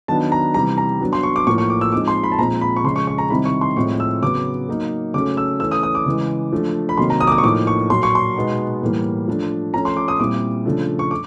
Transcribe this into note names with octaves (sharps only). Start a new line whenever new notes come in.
D#3 F#3 B3 D4 A5
A#5
C3 E3 G3 A#5
A#5
F#3 B3 D4
C6
C#6
D6
A2 F3 A#3 C#6
C#6
D6
E6
F3 G#3 C4 D#4 D6
C6
B5
A5
A#2 F3 G#3 C4 A#5
B5
C#6
C#3 F3 G#3 C6
C#6
C#6
A#5
C3 D#3 G3 C4 E4 B5
C#6
C6
A2 F3 G#3 C4 E4 C#6
E6
C#3 F#3 B3 D6
F#3 A#3 D#4
C#3 F#3 A3 C#4 D6
E6
E3 A3 C#4 E6
D#6
D#6
D6
C#3 E3 G#3
F3 A3 D4
B5
C3 D#3 F#3 A#3 C6
A#5
D#6
D6
D#6
C#6
A2 F3 A#3 D#4 D6
C#6
A#2 F#3 A#3 C6
C#6
C6
B2 G#3 B3 D#4
A2 E3 G3 A#3
F3 A3 D4
F3 A3 C#4 A#5
C6
D6
D#6
A#2 G3 C4 E4 D6
C#3 F3 A3 D4
C#6
D6